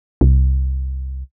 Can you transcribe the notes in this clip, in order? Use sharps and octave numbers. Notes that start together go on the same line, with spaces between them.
C2